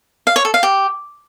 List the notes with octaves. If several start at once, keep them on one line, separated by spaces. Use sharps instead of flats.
F5
C#5
A4
F5
G4